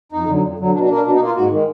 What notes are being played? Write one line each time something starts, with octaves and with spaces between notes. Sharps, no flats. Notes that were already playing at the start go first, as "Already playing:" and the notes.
F2 D#4
D3 F#3
F2
D3 F#3
B2 D4
D4
A#3
D4
B2 D4
D#4
A#3 F4
G#2 F#4
D#3 G#3